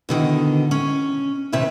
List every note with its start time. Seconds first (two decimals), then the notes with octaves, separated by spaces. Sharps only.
0.09 B2 D3 D#3
0.71 C#4
1.52 D#2 C3 B4 E5